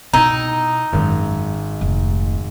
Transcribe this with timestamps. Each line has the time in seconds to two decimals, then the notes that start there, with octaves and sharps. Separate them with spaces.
0.13 B2 D#4 E4 G5 E6 G#6
0.93 G#1 F#2 G#3
1.81 F1